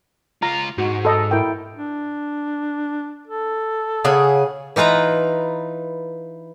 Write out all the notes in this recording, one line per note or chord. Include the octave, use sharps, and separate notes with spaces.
C#2 F4 A#5
G#2 F#4
A4 D#5
E4 A#4 G5
D4
A4
C#3 G#4 F#5
E3 D#4 F4 B4 A#5